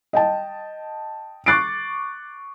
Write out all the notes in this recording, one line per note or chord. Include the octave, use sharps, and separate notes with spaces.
D#5 G5 A5
C#6 D6 F#6 A6 C7 D7